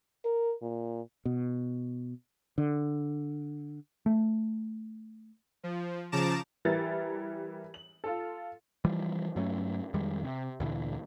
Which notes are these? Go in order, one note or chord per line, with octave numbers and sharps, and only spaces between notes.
A#4
A#2
B2
D3
A3
F3
C#3 F3 A5 A#5 D6 E7
E3 G3 E4 A#4 A6
F#7
F4 A4
E3 F3 G3
G2 F#3 A3 C#4
F2 D#3 G3 G#3
C3
D2 A#2 D3 E3